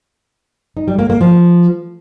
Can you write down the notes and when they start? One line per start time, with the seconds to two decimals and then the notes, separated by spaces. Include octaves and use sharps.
0.77 D#4
0.88 G3
0.99 A#3
1.10 A#3
1.21 F3